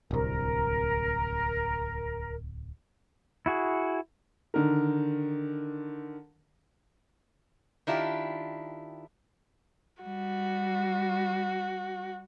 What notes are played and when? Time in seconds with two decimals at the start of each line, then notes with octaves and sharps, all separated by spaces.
0.11 D1 C2 A#4
3.46 E4 F#4 G#4
4.54 D3 D#3 A#4
7.87 D#3 D4 E4 F4 G4
10.03 G3 F#4